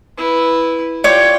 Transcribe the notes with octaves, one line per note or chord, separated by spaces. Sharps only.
E4 B4
F4 C#5 D5 G5 D6